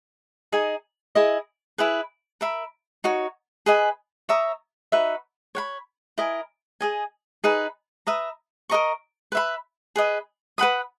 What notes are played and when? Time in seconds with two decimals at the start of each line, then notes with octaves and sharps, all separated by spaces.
0.52 D#4 G#4 D#5 G#5
1.15 E4 G#4 D#5
1.78 E4 G#4 B4
2.41 A#4 E5 B5
3.04 D#4 F#4 C#5
3.66 G#4 B4 D#5 G#5
4.29 C#5 E5 A#5 D#6
4.92 D#4 F#4 B4 E5
5.55 C#5 F#5 B5
6.18 E4 A#4 D#5 G#5
6.81 G#4 D#5 G#5
7.44 D#4 G#4 B4
8.07 B4 E5 A#5 D#6
8.69 A#4 D#5 A#5 C#6
9.32 B4 E5 B5
9.96 G#4 B4 D#5
10.58 B4 F#5 B5 D#6